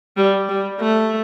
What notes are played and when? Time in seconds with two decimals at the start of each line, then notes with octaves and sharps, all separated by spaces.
0.17 G3
0.49 G3
0.80 A3